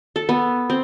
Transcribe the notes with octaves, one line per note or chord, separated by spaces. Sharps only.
A4
B3
C4